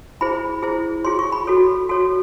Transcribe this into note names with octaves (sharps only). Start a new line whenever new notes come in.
E4 G#4 C5 B5
E4 G#4 C5
F4 G#4 C#5 C6
C#6
B5
F#4 A4 C#5
F#4 A4 C#5